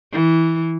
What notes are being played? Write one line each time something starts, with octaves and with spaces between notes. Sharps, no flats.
E3